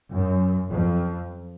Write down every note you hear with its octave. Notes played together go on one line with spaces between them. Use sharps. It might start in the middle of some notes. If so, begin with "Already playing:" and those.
F#2
F2